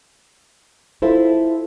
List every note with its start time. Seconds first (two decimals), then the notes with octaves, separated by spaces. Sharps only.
1.02 E4 F4 A4 C5 E5 F5